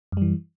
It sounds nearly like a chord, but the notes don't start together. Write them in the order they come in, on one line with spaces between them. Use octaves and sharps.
F#2 G3 E3